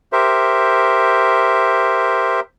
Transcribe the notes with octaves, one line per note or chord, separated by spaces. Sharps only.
G4 A#4 C5 E5